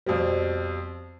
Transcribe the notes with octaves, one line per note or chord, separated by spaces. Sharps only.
F2 B2 G3